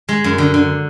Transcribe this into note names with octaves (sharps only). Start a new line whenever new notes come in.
G#3
F#2
D3
D3